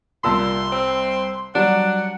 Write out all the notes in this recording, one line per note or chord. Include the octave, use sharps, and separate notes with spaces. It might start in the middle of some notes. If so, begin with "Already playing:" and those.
C2 A#2 A5 C6 E6
C4
F#3 G3 D4 F#5